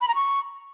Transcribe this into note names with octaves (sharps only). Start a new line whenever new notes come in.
B5
A#5
C#6